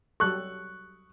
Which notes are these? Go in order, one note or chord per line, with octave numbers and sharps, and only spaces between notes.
F#3 G3 A4 C#6 F#6